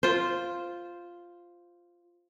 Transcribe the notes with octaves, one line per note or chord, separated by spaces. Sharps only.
F4 C5